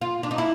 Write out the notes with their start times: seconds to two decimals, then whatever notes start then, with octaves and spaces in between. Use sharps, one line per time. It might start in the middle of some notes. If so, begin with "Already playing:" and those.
0.01 F4
0.23 D4
0.31 D#4
0.38 E4